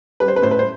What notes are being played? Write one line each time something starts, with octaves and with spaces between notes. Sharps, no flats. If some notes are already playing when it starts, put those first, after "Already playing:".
G3 B4
C5
B4
A2 C5
B4
C5